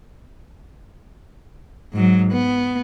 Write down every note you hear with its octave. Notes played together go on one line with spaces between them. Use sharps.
G#2 F#3
B3